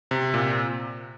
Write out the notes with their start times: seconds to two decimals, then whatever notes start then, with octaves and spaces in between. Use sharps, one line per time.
0.11 C3
0.34 A#2